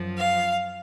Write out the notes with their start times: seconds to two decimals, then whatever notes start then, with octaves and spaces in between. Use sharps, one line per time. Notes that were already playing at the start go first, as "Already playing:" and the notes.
Already playing: F#2 F3
0.17 F5